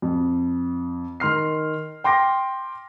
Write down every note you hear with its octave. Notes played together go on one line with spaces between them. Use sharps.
F2
D#3 C6 F6 C7
G5 C6 D6 A#6